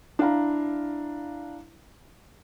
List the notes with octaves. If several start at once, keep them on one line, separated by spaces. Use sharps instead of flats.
D4 E4 F5 A#5